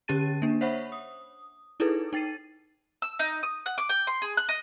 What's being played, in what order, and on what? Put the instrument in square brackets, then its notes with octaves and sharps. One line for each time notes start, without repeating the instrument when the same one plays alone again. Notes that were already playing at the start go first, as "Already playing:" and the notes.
[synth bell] D3 C#4 G4 A5 A6 D#7
A#3 D4
C5 C#5 E5 F#5 B5 C#6
D#6
D#4 E4 G#4 A4 B4
D#4 G5 A6 C7 D#7
[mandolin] E6
D#4
D#6
F#5
D6
G5
C6
G#4
F#6
D#5